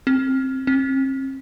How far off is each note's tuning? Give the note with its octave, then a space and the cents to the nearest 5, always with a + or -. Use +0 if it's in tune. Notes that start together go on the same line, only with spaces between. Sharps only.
C4 +15
C4 +40